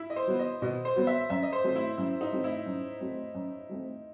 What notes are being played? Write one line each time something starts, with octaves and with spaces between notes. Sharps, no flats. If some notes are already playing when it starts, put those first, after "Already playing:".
Already playing: E4
D#5
C5
F#3 B3 F#4
D#5
B2 D#5
C5
F#3 B3 F#4
E5
F#2 E5
D#5
C5
F#3 A3 C4
E4
F#2 E4
D#4
F#3 A3 C4
E4
F#2
F#3 A3 C4
F#2
F#3 A3 C4